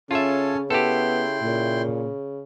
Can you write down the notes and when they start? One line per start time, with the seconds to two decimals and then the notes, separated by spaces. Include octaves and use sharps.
0.11 C#3 C#4 F4 A4 C#5 E5 A5
0.70 B3 E4 G4 A4 G5 C6
1.43 A#2 C#3